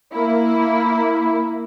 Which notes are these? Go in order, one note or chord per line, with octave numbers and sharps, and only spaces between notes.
A#3 E4